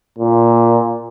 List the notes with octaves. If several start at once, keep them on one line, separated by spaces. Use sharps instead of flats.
A#2